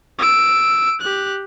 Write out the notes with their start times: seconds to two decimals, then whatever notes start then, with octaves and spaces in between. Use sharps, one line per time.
0.19 E6 D7
1.01 G4 F#6